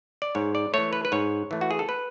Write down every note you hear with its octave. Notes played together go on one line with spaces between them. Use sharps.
D5
G#2 C#5
D5
E3 A3 C#5
B4
B4
G#2 C#5
E3 A3
F#4
G#4
A4
B4